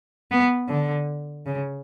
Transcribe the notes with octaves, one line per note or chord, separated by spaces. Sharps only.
B3
D3
C#3